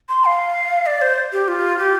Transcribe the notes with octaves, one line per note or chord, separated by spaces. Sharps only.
C6
F5
D5
C5
G4
F4
G4